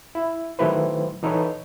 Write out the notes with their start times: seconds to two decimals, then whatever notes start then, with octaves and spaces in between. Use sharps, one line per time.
0.15 E4
0.59 D#3 F#3 A3 E4 B4 C5
1.23 E3 D#4 A4 B4 C#5